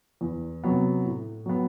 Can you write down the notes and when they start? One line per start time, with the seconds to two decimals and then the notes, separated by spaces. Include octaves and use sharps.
0.21 E2
0.64 C3 F#3 B3
1.05 A2
1.46 F#3 B3